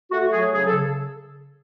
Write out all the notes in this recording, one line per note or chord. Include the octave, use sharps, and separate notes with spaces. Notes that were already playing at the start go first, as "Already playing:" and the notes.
A3 F#4
F#3 G#4
C#3 G#4
A4
C#3